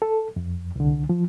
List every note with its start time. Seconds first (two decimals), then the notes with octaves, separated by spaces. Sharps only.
0.02 A4
0.36 F2
0.76 C2 D3
1.09 F3